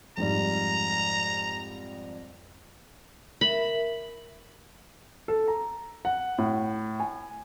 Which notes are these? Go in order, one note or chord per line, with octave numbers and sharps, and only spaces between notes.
F2 G#2 G3 A#5
A#4 E5 B5
A4
A#5
F#5
A2
G#5